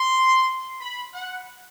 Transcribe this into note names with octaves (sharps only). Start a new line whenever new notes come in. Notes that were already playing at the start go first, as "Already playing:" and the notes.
Already playing: C6
B5
F#5